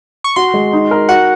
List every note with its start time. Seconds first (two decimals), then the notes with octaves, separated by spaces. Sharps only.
0.24 C#6
0.36 F#4 C6
0.54 G#3
0.73 D#4
0.91 A#4
1.09 F#4 F#5